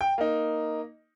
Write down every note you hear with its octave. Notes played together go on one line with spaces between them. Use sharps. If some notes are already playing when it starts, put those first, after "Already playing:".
G5
A#3 D#4